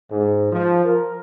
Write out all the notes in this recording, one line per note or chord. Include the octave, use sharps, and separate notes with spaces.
G#2
F3
A#4